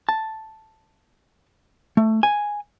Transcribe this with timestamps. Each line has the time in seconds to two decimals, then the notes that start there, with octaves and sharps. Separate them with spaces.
0.09 A5
1.97 A3
2.23 G#5